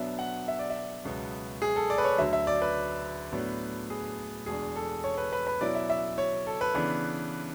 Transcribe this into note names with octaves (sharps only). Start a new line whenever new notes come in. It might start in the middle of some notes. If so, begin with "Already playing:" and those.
Already playing: B2 F#3 B3 D4 E5
F#5
E5
D5
E5
C#2 B2 F#3 B3
G#4
A4
D5
B4
C#5
D2 D3 F#3 E5
E5
D5
B4
A2 F#3 B3 D4
G#4
E2 B2 G#3 D4 G#4
A4
C#5
B4
B4
B4
B2 F#3 C#4 E4 D5
E5
E5
C#5
A4
B4
C#3 E3 B3 D4